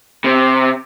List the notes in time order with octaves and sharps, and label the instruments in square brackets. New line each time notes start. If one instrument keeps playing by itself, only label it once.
[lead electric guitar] C3